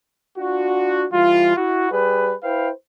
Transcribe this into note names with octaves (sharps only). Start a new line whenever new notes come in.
D4 F4 F#4
E3 G3 F4
E4 F#4
G3 G#4 B4
E4 B4 C5 F5 G5